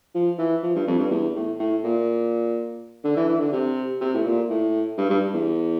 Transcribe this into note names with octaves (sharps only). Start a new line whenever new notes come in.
F3
E3
F3
G2
F2
G2
E2
A2
A2
A#2
D3
E3
E3
D3
C3
C3
A2
A#2
A2
G2
G2
E2